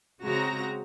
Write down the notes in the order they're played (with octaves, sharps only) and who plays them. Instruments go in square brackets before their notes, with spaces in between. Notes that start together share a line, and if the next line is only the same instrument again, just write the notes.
[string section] C#3 G#3 C4 F#4 A#5 A#6